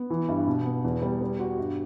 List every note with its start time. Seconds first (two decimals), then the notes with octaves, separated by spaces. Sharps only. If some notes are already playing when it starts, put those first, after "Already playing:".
Already playing: B3
0.10 E3
0.29 G2
0.47 B2
0.65 B3
0.84 E2
1.02 G3
1.21 G3
1.40 F#4
1.59 G2